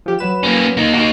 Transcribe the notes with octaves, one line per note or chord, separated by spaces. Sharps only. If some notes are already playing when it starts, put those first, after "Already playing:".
F3 G4
F#3 B4 E7
A#3 C#4
A#3 D#4
A#3 D#4 F#4